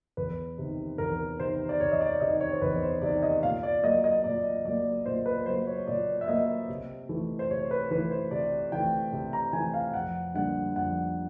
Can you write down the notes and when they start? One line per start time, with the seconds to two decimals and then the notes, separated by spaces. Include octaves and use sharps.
0.17 E2 B4
0.58 C3 D#3
0.98 E2 A#4
1.39 C3 D#3 C5
1.69 D5
1.80 E2 C#5
1.92 D#5
2.01 D5
2.20 C3 D#3 D#5
2.41 C#5
2.53 C5
2.61 E2 B4
2.82 C5
3.02 C3 D#3 D5
3.23 D#5
3.43 A#2 F5
3.63 D5
3.83 F#3 A#3 D#5
4.04 D#5
4.24 A#2 D5
4.65 F#3 A#3 D5
5.06 A#2 C5
5.26 B4
5.46 F#3 A#3 C5
5.67 C#5
5.87 A#2 D5
6.21 E5
6.28 F#3 A#3 D#5
6.69 C3
7.09 E3 A3
7.39 C5
7.50 C3 C#5
7.71 B4
7.91 E3 A3 B4
8.11 C5
8.31 C3 D5
8.72 E3 A3 G5
9.13 C3
9.33 A#5
9.53 E3 A3 G#5
9.74 F5
9.94 F2 F#5
10.34 D3 G3 A#3 F#5
10.76 F2 F#5